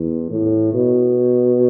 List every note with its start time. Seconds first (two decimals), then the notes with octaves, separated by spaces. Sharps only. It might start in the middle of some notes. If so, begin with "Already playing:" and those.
Already playing: E2
0.31 A2
0.74 B2